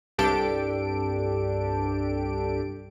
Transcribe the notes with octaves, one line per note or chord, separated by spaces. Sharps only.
C2 G2 D4 G4 A4 D7